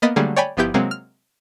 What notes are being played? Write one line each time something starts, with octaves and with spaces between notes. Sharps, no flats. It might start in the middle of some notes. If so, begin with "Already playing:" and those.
A#3 B3 D#5 B5 A6
D3 F#3 G3 A3 A#3 G#4
C#5 D5 G5 G#5 B5
G1 F3 B3 E4 G4 G6
C3 F#3 G#3 A#3 C4
F6